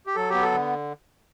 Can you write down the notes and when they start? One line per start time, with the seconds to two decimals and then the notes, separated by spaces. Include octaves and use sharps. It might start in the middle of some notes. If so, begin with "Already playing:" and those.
0.07 G4
0.16 F#3 A4
0.30 B3 G4
0.42 A4
0.52 D3